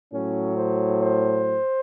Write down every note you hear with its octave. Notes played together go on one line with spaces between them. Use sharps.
A2 F#3 C#4
C5
C5